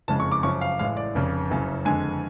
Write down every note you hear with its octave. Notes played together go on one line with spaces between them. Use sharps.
F#1 F2 C#3 G#3 A5
C#6
D6
F#2 C#3 F3 C#6
F5
A1 A2 G#3 F5
D5
F1 F2 C#3
F#1 F#2 C#3
F2 D3 G#3 G#5